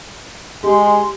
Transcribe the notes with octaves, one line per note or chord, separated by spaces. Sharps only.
G#3 G4 C6